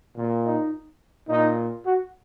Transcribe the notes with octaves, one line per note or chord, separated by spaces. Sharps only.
A#2
D#4
A#2 D#4
F#4